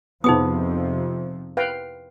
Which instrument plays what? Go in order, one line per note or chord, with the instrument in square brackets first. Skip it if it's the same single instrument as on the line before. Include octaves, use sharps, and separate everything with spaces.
[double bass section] F2 C3 F3 [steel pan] B3 [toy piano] D#4 G#4 D#6
[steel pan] B4 F5 G5